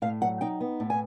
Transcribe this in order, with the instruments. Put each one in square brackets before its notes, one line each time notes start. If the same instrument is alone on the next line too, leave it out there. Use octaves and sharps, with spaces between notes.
[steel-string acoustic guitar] A2 F5
F#3 F#5
D#4 G5
B3
A2
G#5